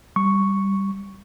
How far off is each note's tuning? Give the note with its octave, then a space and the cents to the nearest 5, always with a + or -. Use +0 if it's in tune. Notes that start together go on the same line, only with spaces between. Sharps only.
G3 +0 C#6 +0